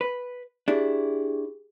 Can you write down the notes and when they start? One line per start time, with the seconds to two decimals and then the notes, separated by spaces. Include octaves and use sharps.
0.01 B4
0.68 D4 E4 G4 G#4